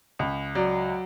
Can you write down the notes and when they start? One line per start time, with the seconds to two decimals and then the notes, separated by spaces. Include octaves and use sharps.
0.19 C#2
0.55 F#3 D5